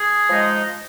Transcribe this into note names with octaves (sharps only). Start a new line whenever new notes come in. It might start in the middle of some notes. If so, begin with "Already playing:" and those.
Already playing: G#4
F3 G#3 D#4